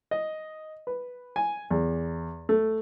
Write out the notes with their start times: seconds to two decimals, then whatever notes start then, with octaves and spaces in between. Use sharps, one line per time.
0.11 D#5
0.87 B4
1.36 G#5
1.71 E2
2.49 A3